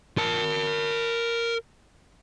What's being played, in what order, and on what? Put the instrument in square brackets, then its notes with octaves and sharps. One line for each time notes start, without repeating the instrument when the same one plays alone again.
[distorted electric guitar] A#4 A5